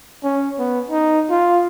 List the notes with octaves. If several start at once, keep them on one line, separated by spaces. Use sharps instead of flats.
C#4
B3
D#4
F4